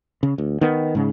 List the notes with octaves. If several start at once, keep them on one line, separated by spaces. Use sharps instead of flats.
C#3
D2
D#3 B3
G#2 C#3